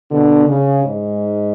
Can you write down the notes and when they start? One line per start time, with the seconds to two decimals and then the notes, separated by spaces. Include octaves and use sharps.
0.11 B2 D3
0.47 C#3
0.84 G#2